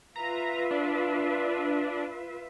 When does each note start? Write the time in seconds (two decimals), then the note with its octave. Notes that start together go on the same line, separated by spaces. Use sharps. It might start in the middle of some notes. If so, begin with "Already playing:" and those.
0.16 F4 B4 E5 A#5
0.71 D4